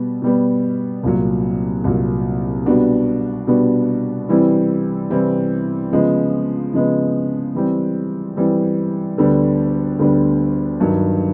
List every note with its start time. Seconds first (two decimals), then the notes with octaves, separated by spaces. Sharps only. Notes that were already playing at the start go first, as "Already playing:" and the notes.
Already playing: B2 G3 B3
0.22 B2 G3 B3
1.03 C2 A#2 F#3
1.84 C2 A#2 F#3
2.66 B2 G3 B3 D4 F#4
3.47 B2 G3 B3 D4 F#4
4.29 C3 E3 G3 C4 E4
5.10 C3 E3 G3 C4 E4
5.92 C#3 F3 G#3 B3
6.74 C#3 F3 G#3 B3
7.55 E3 G3 C4
8.36 E3 G3 C4
9.17 D2 D3 G3 B3 D4
9.99 D2 D3 G3 B3 D4
10.80 G2 D#3 F#3